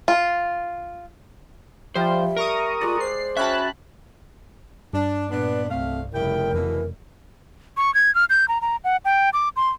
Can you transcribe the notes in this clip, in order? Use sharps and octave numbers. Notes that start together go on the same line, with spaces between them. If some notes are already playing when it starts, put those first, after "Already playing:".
F4
F3 G3 F4 C5 E5 G5
A#4 A#5 C#6 D#6
G#3 F4 D5
C5 C7
C#4 F#4 E5 G5 A5 B5 F#6
G2 D4
A#2 B3 D4 B4
C2 A3 C4 F5
F1 C#3 G3 E4 A#4 G5
F2 B2 E3
C#6
G#6
F6
G6
A#5
A#5
F#5
G5
D6
C6